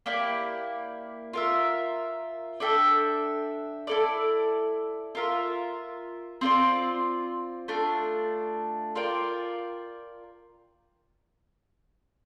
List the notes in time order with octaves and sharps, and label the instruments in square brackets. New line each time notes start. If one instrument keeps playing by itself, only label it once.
[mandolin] A#3 E4 G4 D5
F4 A#4 E5
D4 A4 E5 G5
E4 A4 D5
F4 A#4 E5
C4 F4 A4 D5
A3 D4 F4
F4 A#4 D5 G5